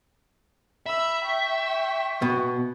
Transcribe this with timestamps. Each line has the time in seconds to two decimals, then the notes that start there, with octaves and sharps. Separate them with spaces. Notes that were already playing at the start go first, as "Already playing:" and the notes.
0.86 E5 B5 E6
1.24 G5 C#6
2.22 B2